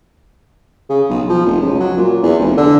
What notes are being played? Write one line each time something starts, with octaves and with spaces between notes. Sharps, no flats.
C#3
B1
F3
F1
C#2
F#3
A#2
E2
F1
D3